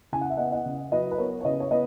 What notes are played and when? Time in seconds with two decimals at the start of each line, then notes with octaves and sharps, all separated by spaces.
0.12 C#3 G#5
0.21 F#5
0.30 E5
0.37 B3 D#5 F#5
0.52 D#5 F#5
0.66 C#3
0.92 F#3 B4 D#5
1.11 B4
1.18 B3 A#4 C#5
1.41 C#5
1.45 C#3 B4 D#5
1.60 C#5
1.71 B3 B4 D#5